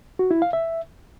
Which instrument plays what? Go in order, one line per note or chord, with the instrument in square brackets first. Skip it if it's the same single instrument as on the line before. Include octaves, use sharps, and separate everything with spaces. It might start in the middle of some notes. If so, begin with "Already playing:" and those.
[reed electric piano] F#4
E4
F5
E5